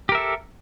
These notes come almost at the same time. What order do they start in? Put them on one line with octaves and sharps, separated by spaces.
G4 A#4 E5 A4